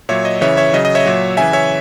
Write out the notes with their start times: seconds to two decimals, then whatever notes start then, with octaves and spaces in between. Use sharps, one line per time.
0.09 A#2 F#3 C#5 E5
0.25 D#5
0.41 C#3 E3 C#5 E5
0.57 C#5 E5
0.73 C#3 F#3 D#5
0.85 D#5
0.95 C#5 E5
1.06 A#2 F#3
1.37 C#3 E3 E5 G#5
1.53 C#5 E5